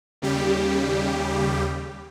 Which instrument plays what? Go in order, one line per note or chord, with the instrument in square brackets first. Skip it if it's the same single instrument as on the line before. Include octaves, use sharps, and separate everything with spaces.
[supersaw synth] D#2 C#3 G3 G4